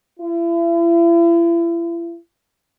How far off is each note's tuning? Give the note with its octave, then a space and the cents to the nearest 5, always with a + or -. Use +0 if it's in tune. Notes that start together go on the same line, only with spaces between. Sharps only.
E4 +40